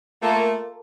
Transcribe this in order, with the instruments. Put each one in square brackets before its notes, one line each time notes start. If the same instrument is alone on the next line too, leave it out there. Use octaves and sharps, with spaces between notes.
[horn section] A3 [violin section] A#3 F4 A4